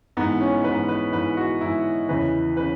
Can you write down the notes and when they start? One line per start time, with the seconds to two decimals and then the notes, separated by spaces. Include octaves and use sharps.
0.17 G#2 E3 B3
0.41 C#4
0.64 G#2 E3 B4
0.88 B4
1.13 G#2 E3 B4
1.37 F#4
1.61 G#2 E3 E4
2.09 E2 C#3 E3 B4
2.57 C#3 B4